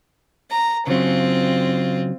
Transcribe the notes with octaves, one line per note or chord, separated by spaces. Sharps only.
A#5
C#3 F#3 C4 F4